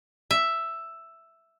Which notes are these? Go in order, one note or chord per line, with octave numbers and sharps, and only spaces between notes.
E5